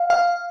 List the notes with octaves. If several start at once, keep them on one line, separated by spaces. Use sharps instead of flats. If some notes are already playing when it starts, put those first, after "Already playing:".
Already playing: F5
F5